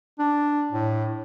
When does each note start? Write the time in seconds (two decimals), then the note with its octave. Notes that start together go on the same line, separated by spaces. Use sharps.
0.19 D4
0.72 A2